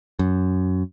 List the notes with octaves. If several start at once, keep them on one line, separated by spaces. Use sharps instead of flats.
F#2